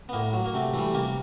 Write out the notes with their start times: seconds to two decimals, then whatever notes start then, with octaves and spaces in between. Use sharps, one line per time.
0.09 B3
0.13 A2 A#3
0.33 F#3
0.46 A#3
0.54 C3 A3
0.74 E3 G3 A3
0.94 C3 A#3